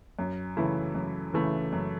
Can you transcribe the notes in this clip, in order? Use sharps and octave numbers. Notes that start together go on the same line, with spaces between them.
F#2
C#3 E3 A3 E4
F#2
C#3 E3 A3 E4
F#2